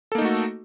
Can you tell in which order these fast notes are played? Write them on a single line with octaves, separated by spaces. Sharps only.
A4 A#3 D#4 A3 F#4